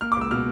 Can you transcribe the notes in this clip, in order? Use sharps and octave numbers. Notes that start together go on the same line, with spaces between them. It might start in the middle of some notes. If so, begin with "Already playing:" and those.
A#3 F6
D6
C#2 E6
B2 F6